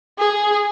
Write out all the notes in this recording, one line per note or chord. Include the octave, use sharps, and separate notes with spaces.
G#4